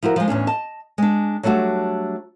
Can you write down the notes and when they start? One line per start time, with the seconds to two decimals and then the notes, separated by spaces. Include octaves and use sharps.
0.02 F3 E4 F#4 A#4
0.16 F3 G#3
0.28 E2 A2 C#4 D4
0.47 D#5 A5
0.98 G#3 D4
1.43 F#3 G3 A3 D4 F#4